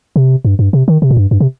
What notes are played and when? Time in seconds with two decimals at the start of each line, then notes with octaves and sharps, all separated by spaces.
0.16 C3
0.45 G2
0.59 G2
0.73 C3
0.88 D#3
1.02 C3
1.11 A#2
1.17 G2
1.31 G2
1.40 C3